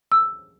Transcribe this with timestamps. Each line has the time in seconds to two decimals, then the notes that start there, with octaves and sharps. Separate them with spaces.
0.12 E6